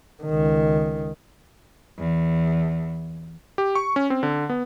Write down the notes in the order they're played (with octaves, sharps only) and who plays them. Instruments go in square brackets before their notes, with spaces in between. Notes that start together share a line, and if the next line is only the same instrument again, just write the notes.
[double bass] C#2 D#3
[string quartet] E2
[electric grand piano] G4
C#6
C#4
C4
D3
B3